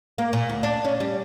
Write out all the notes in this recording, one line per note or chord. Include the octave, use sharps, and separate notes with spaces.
A#3
A#2
D2
D4
C#4
G3